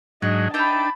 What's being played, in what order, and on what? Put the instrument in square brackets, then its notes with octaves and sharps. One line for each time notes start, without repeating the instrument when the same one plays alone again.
[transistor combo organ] G#2 F#3 [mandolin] D4 [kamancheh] D#5
[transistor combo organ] D4 [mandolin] D#4 E5 G5 [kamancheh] A5 B5